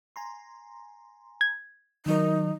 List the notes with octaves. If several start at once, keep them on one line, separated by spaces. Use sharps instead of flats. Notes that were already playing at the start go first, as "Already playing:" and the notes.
G#5 A#5 C6
G#6
D#3 F#3 D#4 A#4